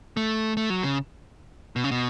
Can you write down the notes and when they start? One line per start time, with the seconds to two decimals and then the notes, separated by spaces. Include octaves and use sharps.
0.17 A3
0.57 A3
0.70 F#3
0.83 C#3
1.76 B2
1.84 C#3
1.91 B2